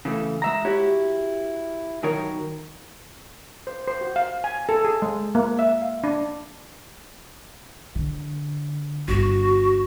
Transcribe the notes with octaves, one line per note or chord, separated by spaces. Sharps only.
C#3 E3 A3
G#3 E5 A#5
E4 F#4 G4 C#5
B1 D#3 F#3 A#4 C#5
C5
C5
F#4
F5
G#5
A4
G#4
G#3
A#3
E5
F5
D4
D3
G1 D4 F#4